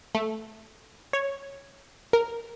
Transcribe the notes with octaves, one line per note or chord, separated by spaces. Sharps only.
A3
C#5
A#4